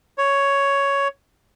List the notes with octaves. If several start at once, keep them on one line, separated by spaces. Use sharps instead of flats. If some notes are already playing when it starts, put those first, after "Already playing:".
C#5